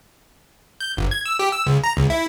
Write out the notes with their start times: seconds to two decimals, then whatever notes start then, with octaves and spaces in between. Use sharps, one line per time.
0.80 G6
0.97 G1
1.11 G#6
1.26 E6
1.39 G4
1.52 E6
1.66 C#2
1.84 A#5
1.97 C#2
2.10 E4